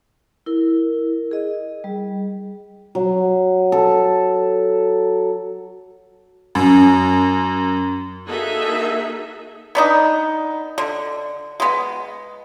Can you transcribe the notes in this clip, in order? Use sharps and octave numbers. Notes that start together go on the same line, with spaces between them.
E4 A#4
G#4 D#5
G3
F#3
A4
F#2
A#3 D#4 F#4 G#4 A4 E5
B3 D4 D#4
D3
G#3 B3